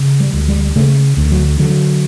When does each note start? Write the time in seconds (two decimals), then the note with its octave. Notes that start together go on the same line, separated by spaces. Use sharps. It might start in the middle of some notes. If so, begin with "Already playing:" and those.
Already playing: C#3
0.20 G3
0.33 D2
0.48 G3
0.76 C#3 A3
1.17 D2
1.32 F#3
1.59 D3 F#3